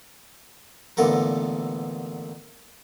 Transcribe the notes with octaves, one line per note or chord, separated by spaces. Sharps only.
A1 A#2 D3 B3 A4 A#4